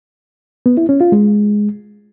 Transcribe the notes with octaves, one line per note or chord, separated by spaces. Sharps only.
B3
E4
C#4
F4
G#3